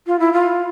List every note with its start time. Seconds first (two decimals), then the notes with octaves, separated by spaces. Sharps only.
0.07 F4
0.19 E4
0.33 F4